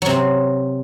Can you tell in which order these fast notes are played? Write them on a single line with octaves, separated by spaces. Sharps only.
F#3 C3 C4